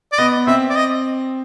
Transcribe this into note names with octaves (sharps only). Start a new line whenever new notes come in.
D5
B3 D#5
C4 E5
D5
D#5